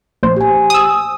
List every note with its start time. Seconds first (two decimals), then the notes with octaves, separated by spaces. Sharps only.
0.23 A#1 C5
0.36 G4 G#5
0.70 D#6 E6